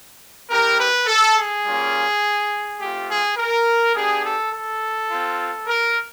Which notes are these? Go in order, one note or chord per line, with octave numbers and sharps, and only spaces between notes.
C4 E4 G4 A#4
B4
A4
G#4
G3 A#3 C#4 F4
A3 C4 F4 G4
G#4
A#4
B3 D4 G4 G#4
A4
A4
C4 F4
A#4